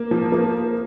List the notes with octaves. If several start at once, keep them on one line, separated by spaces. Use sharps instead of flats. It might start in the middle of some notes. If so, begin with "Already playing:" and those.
Already playing: A#3
F3
A#3